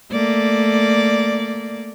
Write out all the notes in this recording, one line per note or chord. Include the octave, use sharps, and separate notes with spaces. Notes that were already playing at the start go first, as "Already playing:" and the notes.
A3 A#3 D5